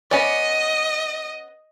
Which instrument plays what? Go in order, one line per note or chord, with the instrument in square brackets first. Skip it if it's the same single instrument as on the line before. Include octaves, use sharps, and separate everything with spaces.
[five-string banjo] B3 C#4 D5 [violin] D#5